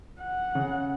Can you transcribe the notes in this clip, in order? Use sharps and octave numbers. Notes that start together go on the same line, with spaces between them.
F#5
C#3